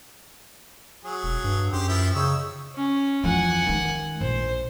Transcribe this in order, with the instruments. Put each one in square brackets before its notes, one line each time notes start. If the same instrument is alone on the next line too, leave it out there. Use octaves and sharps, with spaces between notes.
[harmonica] F#3 G#4
[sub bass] E1
G2
[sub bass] F#2 [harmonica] G4 C5
[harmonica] F3 E4 G5
[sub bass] C#3 [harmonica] D#4 C#5 E6
[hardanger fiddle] C#4
[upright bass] F2 E3 [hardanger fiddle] F#5 G#5
[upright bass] D#3 G#3
[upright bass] A#1 [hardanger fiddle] C5